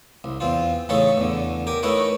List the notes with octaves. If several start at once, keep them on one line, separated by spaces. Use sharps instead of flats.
C2
E2 C4 F4
A1 C#3 C#4 D#4 A4 C#5
E2 D3
G4 A#4 G#5
A3 D#4 E4 A#4 B4 C#5